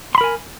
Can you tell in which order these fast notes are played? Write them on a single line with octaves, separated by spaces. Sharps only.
C6 B5 A#4 G#5